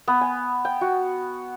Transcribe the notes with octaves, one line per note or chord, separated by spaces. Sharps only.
B3
G#5
G5
F#4